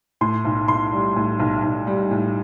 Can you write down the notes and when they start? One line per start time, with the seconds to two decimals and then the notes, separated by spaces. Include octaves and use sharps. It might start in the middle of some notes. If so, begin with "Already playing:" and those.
0.21 A2 C6
0.45 B1
0.68 B1 C6
0.92 G3
1.16 A2
1.39 B1
1.63 B1
1.87 G3
2.11 A2